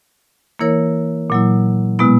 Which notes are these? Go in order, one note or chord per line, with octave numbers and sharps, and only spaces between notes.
E3 A#3 E4 A#4 C#5
A#2 F#3 A#3 E4
B2 G#3 B3 E4